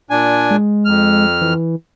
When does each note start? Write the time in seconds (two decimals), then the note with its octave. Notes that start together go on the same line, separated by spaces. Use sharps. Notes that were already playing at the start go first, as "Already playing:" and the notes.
0.10 A#2 D4 G#5
0.51 G#3
0.85 F2 F6
1.41 E3